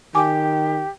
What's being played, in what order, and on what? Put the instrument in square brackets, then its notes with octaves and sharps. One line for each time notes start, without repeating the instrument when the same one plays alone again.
[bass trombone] D#3 [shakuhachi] G4 [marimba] G#5 D6